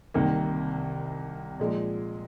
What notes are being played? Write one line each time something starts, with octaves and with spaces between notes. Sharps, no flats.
C2 C3 D#3 A#3
A#2 F3 G#3